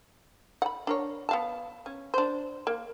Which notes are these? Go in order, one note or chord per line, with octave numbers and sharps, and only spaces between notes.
F#5 B5
D4 A#4 C#5
B3 F5 A5
C#4
D4 C5
A#3